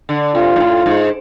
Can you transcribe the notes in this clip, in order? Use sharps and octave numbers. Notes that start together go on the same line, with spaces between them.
D3
C3 F4
G#2
A2
G#2